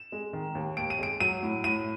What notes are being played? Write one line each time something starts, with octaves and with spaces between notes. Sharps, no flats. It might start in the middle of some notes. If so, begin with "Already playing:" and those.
Already playing: E7
G#3
D#3
D#2
D#2 D7
D#7
G#3 D7
F#3 D#7
A2
A2 D#7